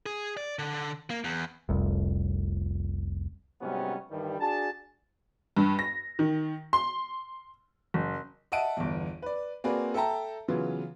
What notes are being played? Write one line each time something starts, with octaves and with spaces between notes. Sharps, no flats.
G#4
D5
D3
A#3
E2
F1 C2
G#2 C3 F#3 G3 B3 C#4
G2 D#3 E3 G3
D4 F#4 G#4 G#5 A5
G2
A#6
D#3
C6
F#1
D#5 E5 F#5 A5 D7 D#7
G1 E2
B4 D5
A#3 C4 F#4 G#4 B4 D5
A4 E5 G5 A5 A#5
C#3 E3 F#3 B3 F4